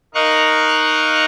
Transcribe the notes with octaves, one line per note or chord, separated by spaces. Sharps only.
D#4 A#4 D#5 F5 C#6 F#6